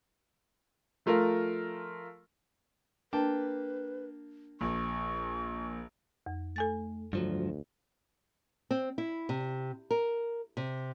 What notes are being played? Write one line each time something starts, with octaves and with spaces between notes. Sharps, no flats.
F3 A3 F4 A#4
A#3 D4 B4 G5 A5
A#1 C#6
F2
A3 A4 G#5 A6
D2 G2 F3 F#3
C4
E4
C3
A#4
C3